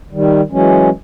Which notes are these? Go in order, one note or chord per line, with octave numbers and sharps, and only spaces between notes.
D#3 G3
E3 F#3 G#3 C#4